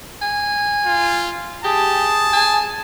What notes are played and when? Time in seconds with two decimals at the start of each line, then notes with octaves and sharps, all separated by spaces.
0.22 G#5
0.86 F4
1.64 G4 G#4 A5
2.33 G#5